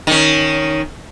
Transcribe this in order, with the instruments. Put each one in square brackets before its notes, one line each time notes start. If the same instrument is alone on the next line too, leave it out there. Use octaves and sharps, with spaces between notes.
[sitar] D#3 C#4